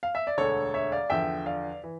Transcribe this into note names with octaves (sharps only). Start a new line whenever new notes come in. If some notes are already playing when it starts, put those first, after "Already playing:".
F5
E5
D5
E1 D2 D3 A4 C#5
C#5 E5
D5 F5
E2 D3 F3 E5 G5
D5 F5
E3